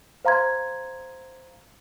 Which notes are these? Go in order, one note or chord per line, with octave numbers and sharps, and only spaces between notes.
C5 F5 A#5 C6 G#6